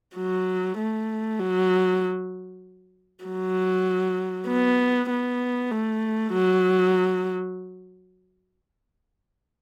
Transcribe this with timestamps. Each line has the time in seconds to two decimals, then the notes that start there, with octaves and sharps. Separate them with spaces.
0.16 F#3
0.78 A3
1.40 F#3
3.25 F#3
4.48 B3
5.10 B3
5.71 A3
6.33 F#3